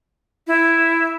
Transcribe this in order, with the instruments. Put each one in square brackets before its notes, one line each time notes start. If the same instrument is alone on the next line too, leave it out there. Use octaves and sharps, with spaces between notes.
[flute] E4